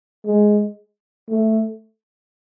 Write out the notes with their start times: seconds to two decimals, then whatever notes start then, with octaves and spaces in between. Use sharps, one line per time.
0.26 G#3
1.29 A3